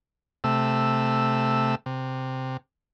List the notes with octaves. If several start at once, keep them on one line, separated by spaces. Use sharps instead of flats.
C3 A3 E6
C3